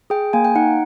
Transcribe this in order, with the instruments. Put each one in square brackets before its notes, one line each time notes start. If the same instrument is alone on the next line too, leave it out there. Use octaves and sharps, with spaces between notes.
[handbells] G#4 G5
A#3 G#5
G5
D#4 F#5